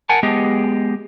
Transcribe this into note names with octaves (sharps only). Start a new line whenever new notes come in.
A#4 F#5 G#5 A5
G#3 B3 G4 G#4 D#5